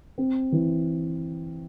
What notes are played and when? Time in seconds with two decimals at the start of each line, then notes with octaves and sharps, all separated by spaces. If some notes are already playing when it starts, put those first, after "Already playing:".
0.18 C4
0.52 E3